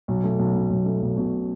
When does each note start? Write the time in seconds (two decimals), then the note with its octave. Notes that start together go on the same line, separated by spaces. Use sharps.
0.08 B1
0.24 A3
0.39 B1
0.55 B2
0.70 B1
0.86 A3
1.02 B1
1.17 B2